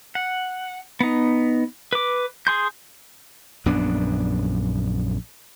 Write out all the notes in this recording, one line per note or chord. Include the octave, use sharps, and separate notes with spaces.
F#5
B3 D#4
B4 D6
G#4 C6 G6
A#1 F#2 B3 D4